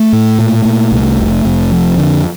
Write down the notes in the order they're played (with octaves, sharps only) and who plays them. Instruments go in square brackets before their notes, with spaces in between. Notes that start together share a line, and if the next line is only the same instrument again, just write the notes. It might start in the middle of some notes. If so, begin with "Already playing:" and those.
Already playing: [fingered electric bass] A3
A2
A#2
A#2
C2
F1
F1
F2
D3